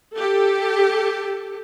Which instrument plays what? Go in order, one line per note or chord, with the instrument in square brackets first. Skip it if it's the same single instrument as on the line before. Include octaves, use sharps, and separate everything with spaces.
[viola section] G4 A4